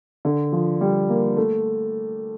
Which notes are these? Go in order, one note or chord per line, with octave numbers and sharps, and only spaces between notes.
D3
F3
G3
A#3
A3